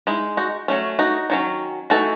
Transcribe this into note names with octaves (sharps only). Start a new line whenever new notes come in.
G#3 D#4 E4
D#4 F#4
F#3 A3 C#4
D#4 F#4
D#3 F#3 C#4
E3 A3 D#4 F#4 A4